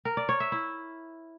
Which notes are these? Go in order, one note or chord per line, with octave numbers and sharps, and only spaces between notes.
A#4
D5
C#5
E5
E4